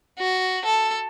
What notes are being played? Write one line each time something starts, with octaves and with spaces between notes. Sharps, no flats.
F#4
A4